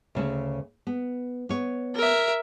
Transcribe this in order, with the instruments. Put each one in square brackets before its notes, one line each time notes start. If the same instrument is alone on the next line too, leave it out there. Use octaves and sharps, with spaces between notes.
[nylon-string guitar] D2 C#3 A3
B3
B3 C#5
[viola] A#4 E5